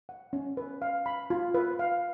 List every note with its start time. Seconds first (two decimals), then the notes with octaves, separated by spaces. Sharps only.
0.09 F#5
0.33 C#4
0.57 B4
0.82 F5
1.06 B5
1.30 F4
1.54 B4
1.79 F5